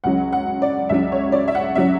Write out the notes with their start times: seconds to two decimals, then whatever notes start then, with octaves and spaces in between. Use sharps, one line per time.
0.04 C#2 C#3 F#3 C#4 F#5
0.33 F#5
0.62 D5
0.89 C#2 C#3 F#3 C#4 E5
1.12 C#5
1.32 D5
1.48 E5
1.55 F#5
1.75 C#3 F#3 C#4 E5